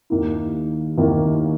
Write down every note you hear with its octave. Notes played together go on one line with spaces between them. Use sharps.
D#2 D#3 A#3 E4
D#2 D#3 A#3 E4